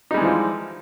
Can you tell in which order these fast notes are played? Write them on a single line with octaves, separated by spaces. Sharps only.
D#4 G3 G#3 E3 F3